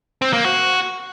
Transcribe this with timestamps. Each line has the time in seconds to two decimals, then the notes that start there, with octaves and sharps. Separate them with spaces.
0.22 C4
0.33 A#3
0.45 F#4